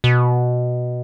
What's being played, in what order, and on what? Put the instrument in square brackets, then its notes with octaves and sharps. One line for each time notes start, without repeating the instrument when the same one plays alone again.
[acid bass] B2